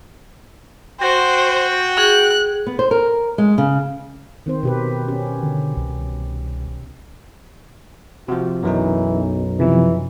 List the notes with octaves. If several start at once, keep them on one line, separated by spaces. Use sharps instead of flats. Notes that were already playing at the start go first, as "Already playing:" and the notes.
F#4 C5 G5
G#4 F#6
B3
C5
A#4
G#3
C#3
D#3 C4 C5
B2 G4 B4
C#4 G4
D3
C2
C3 F3 F#4
B1 F#2 E3 F#3 D#4
C3 E3 F3